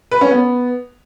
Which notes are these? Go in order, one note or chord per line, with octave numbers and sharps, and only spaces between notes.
B4
C#4
B3